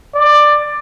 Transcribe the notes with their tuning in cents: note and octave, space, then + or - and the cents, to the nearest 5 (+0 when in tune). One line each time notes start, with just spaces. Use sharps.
D5 +15